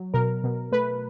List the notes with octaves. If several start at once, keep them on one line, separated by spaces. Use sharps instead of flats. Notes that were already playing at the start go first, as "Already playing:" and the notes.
Already playing: F#3
B2 A#4
B2
A3 B4